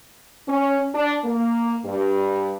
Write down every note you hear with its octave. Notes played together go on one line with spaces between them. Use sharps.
C#4
D4
A#3
G2